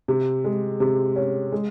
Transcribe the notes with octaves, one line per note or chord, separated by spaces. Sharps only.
C3
G#3
C3
C#4
G#3